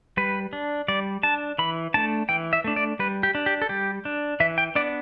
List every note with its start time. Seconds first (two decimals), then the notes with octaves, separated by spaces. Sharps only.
0.17 G3 B4
0.53 D4
0.88 G3 D5
1.23 D4 A5
1.59 E3 B5
1.94 A3 D4 A5
2.29 E3 G5
2.53 E5
2.64 A3 D4
2.76 D5
2.99 G3 B4
3.23 G4
3.35 D4
3.46 G4
3.62 A4
3.69 G3 G4
4.05 D4
4.40 E3 E5
4.58 G5
4.75 B3 D4 D5